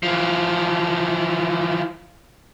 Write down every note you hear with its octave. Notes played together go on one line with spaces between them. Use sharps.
E3 F3